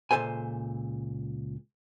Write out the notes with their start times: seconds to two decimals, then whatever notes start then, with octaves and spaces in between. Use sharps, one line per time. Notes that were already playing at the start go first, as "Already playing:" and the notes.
0.11 C#2 A#2 C4 A4 C5 G#5